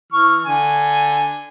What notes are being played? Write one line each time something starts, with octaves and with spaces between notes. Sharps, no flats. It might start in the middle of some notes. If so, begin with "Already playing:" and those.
E3 C#6 F6
D3 G#5